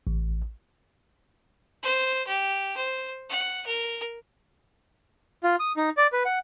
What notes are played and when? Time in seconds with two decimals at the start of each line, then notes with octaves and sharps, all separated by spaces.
0.07 A1
1.83 C5
2.27 G4
2.77 C5
3.29 F#5
3.66 A#4
5.43 F4
5.60 D#6
5.77 D#4
5.97 D5
6.13 B4
6.25 F#5